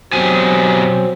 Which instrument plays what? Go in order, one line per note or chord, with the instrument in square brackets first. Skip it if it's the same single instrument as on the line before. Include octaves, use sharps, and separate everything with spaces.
[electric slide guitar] B2 G4 G#5 [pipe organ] F#3 C4